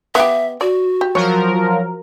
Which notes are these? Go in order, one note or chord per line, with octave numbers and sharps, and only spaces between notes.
B3 G4 E5
F#4 D5
G4
F3 F#3 A#4 C#5